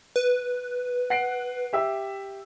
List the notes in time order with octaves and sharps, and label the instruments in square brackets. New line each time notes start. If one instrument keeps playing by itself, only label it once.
[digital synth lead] B4
[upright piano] F#5 C7 D7
G4 E5 E6